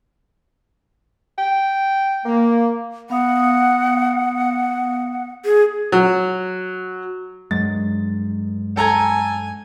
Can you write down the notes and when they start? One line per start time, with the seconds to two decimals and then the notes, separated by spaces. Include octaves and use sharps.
1.38 G5
2.26 A#3
3.10 B3 F5 F#5 D#6
5.45 G#4
5.92 F#3
7.51 G2 F#3 G#3 A6
8.77 A4 G#5 A#5 G#6